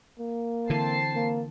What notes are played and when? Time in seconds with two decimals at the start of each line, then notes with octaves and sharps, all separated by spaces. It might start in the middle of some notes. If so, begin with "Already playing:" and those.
0.19 A#3
0.70 D3 E3 C4 A5 C7
1.15 A#3